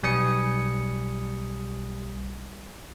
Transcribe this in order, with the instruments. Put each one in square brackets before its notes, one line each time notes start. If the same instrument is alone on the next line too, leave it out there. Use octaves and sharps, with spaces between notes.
[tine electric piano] B1 G3 G#5 D#6 C#7